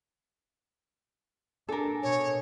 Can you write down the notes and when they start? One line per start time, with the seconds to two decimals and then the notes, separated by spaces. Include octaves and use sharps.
1.69 D4 A4 A#4 G#5
2.03 B2 C#5